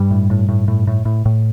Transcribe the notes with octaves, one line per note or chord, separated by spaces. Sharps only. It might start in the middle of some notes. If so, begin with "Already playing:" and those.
Already playing: G2 G3
A2
A2
A2
A2
A2
A2
A2